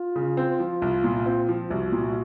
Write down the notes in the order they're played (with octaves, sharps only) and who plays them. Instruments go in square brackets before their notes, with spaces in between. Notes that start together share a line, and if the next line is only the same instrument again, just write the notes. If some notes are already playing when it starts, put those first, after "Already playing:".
Already playing: [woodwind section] F4
[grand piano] C#3
C4
F3
C2
A#2
C4
F3
[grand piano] C2 [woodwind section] F#4
[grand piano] A#2